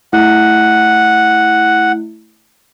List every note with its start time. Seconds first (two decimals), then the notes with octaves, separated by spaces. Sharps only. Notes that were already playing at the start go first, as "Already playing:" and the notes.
0.13 A3 E4 F#5